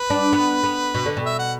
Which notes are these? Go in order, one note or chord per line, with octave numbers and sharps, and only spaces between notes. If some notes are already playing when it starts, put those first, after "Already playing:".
Already playing: B4
D4
B3
B3
B2
D3
B2
E5
F#5